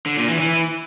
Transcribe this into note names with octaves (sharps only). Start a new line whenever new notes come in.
D3
A#2
E3
E3